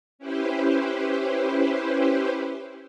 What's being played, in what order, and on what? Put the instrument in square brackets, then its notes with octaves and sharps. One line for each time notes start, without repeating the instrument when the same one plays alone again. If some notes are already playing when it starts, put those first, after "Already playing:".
[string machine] C#4 E4 G4 B4 C5